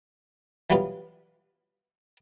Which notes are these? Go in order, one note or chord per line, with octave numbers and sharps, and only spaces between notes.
E3 F#3 G3 B3 F4